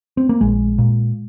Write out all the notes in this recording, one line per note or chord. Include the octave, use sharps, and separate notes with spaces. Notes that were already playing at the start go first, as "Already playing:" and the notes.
C4
A#3
A#1 G#3
A#2